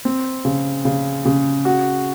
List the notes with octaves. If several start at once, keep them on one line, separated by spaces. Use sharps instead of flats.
C4
C#3
C#3
C#3
F#4